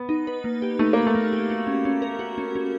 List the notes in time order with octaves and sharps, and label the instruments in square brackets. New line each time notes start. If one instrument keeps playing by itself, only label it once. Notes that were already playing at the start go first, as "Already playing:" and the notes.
Already playing: [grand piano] B3
[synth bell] D#4
B4
A#3
G4
[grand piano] A3 [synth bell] D#4
[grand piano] A#3 [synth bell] B4
[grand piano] A3
[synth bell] A#3
G4
F#4
C#4
C#4
A#4
F#4
C#4
C#4